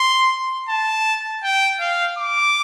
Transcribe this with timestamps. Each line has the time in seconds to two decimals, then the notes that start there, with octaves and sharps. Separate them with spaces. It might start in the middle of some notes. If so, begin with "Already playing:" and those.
Already playing: C6
0.69 A5
1.44 G5
1.80 F5
2.19 D6